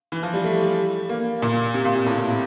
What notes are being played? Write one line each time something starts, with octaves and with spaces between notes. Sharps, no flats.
E3
F3
G3
A3
G3
A#3
A#2
C3
A#2
A#2
A2
A#2
C3